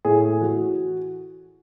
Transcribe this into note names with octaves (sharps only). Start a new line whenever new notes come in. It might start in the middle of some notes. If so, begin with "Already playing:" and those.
A2 G#4
E3 F#4